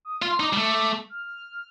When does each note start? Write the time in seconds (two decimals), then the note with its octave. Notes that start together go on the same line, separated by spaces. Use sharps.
0.05 D#6
0.22 F4 C6
0.40 D#4 D6
0.53 G3
0.57 A3
1.10 F6